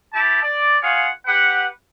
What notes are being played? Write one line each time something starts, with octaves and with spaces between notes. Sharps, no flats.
E4 G4 A5
D5
F4 G#4 C#5 F5 F#5
G4 B4 F#5